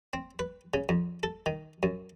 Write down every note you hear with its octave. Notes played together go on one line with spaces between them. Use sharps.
C4
B4
C#3
F2
A4
D#3
F#2